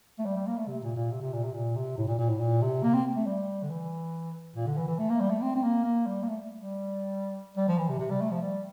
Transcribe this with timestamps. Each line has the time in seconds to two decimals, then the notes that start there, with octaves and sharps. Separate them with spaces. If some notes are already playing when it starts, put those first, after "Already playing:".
0.19 A3
0.26 G3
0.36 G3
0.47 A#3
0.57 A3
0.68 C3
0.83 A#2
0.96 A#2
1.11 C3
1.22 C3
1.33 A#2
1.43 C3
1.54 A#2
1.76 C3
1.98 A2
2.08 A#2
2.19 A#2
2.29 A2
2.41 A#2
2.62 C3
2.83 A#3
2.94 C4
3.16 A3
3.27 G3
3.63 D3
3.70 E3
4.56 A#2
4.67 D3
4.77 E3
4.88 E3
4.99 A3
5.10 A#3
5.20 G3
5.31 A3
5.42 C4
5.56 C4
5.63 A#3
5.84 A#3
6.07 G3
6.24 A#3
6.28 A3
6.60 G3
7.57 G3
7.68 F3
7.79 E3
7.89 C3
7.99 C3
8.11 G3
8.21 A3
8.32 F3
8.42 G3